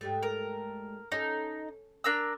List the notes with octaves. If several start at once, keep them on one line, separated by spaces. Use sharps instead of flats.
G#2 G3 A3
A#4
C#4 D#4 A4
D4 A#4 E6